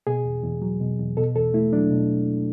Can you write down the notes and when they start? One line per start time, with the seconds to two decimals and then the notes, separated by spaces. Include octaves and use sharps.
0.07 B2 G#4
0.25 E2
0.43 E2
0.62 F#3
0.80 B2
0.99 E2
1.17 B2 A4
1.35 E2 A4
1.54 A3 E4
1.73 F#3 D4
1.91 B2